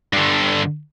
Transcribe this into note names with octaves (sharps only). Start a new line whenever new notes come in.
G2 D3